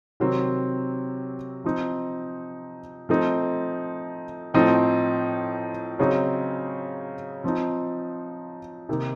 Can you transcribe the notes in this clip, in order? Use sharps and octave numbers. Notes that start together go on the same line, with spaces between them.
C3 D#3 F#3 C4
F3 C4 D#4
F3 A3 C4 D#4
A2 F3 C4 D#4
C#3 F#3 C4 D#4
F3 C4 D#4
C3 D#3 A#3 D#4